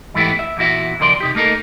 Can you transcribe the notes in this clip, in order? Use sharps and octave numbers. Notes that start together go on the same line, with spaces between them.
G#2 E3 A3 B3 E4 G4
E5
E2 A#2 E4 F#4 E5
D#2 C#3 F3 A#4 D5 C6
C3 D#4 G4
A3 A#3 D#4 A4 A#4